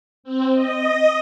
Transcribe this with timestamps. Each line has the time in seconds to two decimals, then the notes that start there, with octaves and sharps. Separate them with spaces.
0.24 C4
0.54 D#5